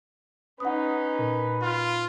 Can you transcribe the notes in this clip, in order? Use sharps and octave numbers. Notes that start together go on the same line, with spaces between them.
C#4 D#4 B4 F#5 D#6
A#2
F4